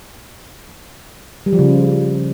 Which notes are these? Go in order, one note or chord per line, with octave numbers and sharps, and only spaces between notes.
G3
F3
C#3